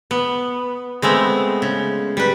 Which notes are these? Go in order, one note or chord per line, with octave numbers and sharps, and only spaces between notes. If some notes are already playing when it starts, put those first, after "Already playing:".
B3
G#3 A3 B3 C4
C#3
G3 B4